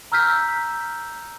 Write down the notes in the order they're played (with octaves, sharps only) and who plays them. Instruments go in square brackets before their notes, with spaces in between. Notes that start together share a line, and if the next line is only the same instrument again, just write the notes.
[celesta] A#5 E6 F6 G6 B6